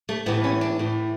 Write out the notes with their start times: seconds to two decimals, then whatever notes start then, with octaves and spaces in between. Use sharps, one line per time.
0.09 A3
0.26 A2 E3 B3
0.44 C#4
0.61 D4
0.79 A2 E3